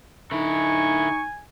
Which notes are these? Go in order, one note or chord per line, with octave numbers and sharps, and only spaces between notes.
D3 D#4 E4 G#5 C#6